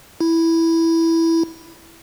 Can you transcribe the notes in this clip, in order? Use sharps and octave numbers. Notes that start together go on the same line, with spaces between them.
E4